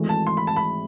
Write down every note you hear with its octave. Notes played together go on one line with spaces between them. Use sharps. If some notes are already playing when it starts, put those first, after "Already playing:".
Already playing: G#1 G#2 E3 A3
A5
C6
B5
A5
B5